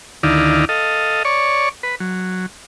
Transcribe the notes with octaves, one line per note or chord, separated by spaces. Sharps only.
D2 D#3 D#4 E4 D5 F5
A4 D#5 F5
C#5 D5 C#6
B4
F#3